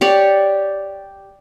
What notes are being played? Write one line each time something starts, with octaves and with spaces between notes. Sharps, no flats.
G4 C#5 D5